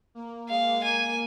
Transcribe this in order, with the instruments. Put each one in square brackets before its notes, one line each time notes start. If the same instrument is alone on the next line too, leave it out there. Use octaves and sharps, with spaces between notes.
[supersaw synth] A#3
[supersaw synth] G#3 [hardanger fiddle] F5
[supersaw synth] A#3 [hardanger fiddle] G#5